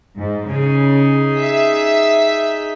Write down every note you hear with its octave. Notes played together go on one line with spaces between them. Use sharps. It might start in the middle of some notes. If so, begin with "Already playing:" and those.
G#2
C#3 D#4 G#4
E5 B6